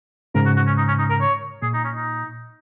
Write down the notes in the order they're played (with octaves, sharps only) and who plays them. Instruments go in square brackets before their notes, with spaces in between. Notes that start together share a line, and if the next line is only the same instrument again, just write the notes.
[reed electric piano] G#2 C#3 [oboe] A#4
[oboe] F#4
F#4
C#4
D#4
C#4
D#4
A#4
C#5
[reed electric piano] A#2 [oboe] G#4
[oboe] D#4
C#4
D#4